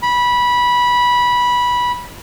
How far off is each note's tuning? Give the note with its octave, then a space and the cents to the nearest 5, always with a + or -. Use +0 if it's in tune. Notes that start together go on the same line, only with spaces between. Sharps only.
B5 -15